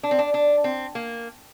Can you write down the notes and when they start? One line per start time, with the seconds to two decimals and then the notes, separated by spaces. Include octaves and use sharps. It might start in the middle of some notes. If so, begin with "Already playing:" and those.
0.03 D4
0.11 C4
0.19 D4
0.34 D4
0.64 C4
0.95 A#3